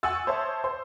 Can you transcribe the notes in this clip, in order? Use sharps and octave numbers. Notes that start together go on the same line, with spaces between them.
F#5 G#5 C#6 D#6 E6 A6
C5 C#5 E5 A5 C6
C5